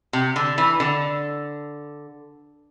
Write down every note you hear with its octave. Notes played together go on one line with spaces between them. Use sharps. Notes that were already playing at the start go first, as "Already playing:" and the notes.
C3
D3
E3
D3